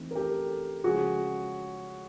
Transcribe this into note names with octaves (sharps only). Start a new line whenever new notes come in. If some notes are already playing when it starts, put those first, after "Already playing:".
Already playing: E3 A3 C4 D#4
A#4
G4 A4
C#3 F3 G#3 F#4 G#4